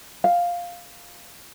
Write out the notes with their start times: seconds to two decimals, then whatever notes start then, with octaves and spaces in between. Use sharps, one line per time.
0.24 F5